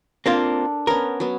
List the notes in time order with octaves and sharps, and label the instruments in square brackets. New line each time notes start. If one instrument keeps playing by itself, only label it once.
[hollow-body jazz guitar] A#3 C4 F4 [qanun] D4 A4 A#4
[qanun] B3 C#4 [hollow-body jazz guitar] A#4
[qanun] F#3 B3